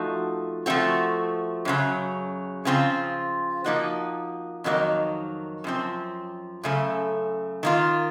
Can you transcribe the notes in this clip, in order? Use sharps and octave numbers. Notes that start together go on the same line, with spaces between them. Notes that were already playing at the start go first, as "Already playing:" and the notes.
Already playing: F3 A3 D#4 F#4
F3 A3 C4 F#4
F#2 C#3 F#3
C#3 F3 C4 F4
F3 A#3 D#4 F#4
F2 D#3 F#3 A#3 D#4
F#2 F3 C4
F#2 C#3 A3
D#3 A#3 F4